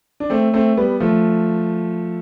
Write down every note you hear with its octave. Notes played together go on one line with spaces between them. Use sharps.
D4
A3 C4
A3 C4
G3 B3
F3 A3